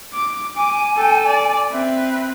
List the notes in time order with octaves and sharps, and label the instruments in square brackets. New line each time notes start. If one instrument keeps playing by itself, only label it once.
[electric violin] D6
[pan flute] G#5 [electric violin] D6
[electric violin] A4 G5
D5
[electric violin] C4 B4 [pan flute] E5